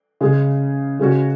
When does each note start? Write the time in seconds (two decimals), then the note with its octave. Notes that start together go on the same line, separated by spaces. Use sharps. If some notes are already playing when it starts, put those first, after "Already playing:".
0.21 C#3 G#3 C#4 G#4
0.99 C#3 G#3 C#4 F#4